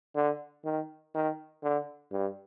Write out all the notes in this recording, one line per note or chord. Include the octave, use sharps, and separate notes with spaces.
D3
D#3
D#3
D3
G2